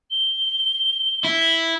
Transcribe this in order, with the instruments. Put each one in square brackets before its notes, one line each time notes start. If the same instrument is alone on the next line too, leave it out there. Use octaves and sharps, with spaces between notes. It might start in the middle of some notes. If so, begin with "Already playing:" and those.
[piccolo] G7
[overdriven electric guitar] E4